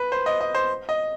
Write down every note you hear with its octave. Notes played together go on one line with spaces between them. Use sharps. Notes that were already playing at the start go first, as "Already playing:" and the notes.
Already playing: B4
C5
D#5
D#5
C5
D#5